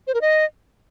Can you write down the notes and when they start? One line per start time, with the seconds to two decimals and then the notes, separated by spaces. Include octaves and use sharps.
0.07 C5
0.14 A#4
0.21 D#5